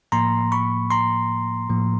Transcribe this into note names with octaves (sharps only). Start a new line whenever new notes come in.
A2 F3 A#3 A#5 C6
B5 C#6
A#5 C6
A2 F3 A#3